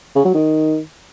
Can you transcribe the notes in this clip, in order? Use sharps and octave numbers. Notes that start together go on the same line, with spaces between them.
C#3
F#3
D#3